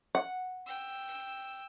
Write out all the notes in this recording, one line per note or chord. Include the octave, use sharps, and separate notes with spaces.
F#5
G5 E6